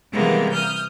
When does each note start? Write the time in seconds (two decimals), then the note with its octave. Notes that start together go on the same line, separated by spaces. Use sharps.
0.12 C3 E3 G3 G#3 A#3 B3
0.52 D#6 F6 G6